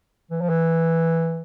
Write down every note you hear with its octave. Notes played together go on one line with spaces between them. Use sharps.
E3
F3
E3